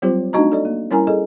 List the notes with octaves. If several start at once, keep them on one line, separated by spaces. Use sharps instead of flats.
F#3 G3 C4 F4 G4 C5
A3 D4 D#4 F#4 D#5 A#5
A4 D5 D#5
A#3
G3 C#4 E4 A#4 G#5 A#5
G#4 A4 D#5